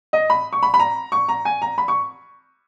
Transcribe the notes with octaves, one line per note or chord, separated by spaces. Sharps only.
D#5
B5
C#6
B5
B5
A#5
C#6
A#5
G#5
A#5
B5
C#6